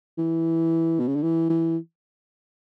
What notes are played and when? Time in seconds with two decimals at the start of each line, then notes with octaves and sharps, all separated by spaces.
0.18 E3
1.00 B2
1.08 C#3
1.16 D3
1.23 E3
1.50 E3